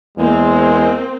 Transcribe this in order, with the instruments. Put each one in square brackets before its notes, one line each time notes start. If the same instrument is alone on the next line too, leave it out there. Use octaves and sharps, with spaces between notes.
[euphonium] E2 [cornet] G#3 [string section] A#3 C4